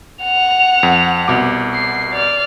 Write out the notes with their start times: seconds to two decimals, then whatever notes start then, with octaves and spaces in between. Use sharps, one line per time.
0.24 F#5 F7
0.83 F2
1.28 C2 B2 D6
1.74 C7
2.12 D5 F6